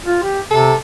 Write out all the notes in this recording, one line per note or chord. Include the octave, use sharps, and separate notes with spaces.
F4
G4
C3 A4